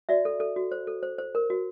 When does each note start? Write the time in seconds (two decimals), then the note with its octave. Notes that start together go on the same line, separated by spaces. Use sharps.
0.09 F#4 D5 E5
0.25 A4
0.40 A4
0.56 F#4
0.72 C5
0.87 A4
1.03 C5
1.18 C5
1.35 A#4
1.50 F#4